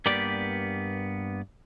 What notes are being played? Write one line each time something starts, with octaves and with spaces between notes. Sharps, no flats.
G2 A#3 B3 G4 D5